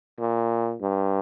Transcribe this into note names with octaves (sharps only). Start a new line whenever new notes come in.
A#2
G2